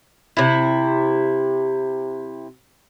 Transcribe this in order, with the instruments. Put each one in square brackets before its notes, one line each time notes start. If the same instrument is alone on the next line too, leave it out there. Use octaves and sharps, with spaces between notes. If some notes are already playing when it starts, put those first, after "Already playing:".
[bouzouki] C3 E4